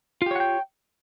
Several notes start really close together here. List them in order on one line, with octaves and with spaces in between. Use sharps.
F4 G4 C#5 F#5 G5